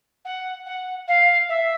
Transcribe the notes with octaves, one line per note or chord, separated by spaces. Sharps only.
F#5
F#5
F5
E5